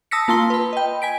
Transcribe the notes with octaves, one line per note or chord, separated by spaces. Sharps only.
A5 D#6 E6 A#6 B6 C#7
A#3 F4 A5 C6 G7
B4 B5
D#5 G5
G#5 B6 D7